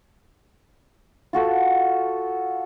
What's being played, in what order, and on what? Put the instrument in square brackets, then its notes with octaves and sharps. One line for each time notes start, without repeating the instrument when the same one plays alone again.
[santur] F4 F#4 A4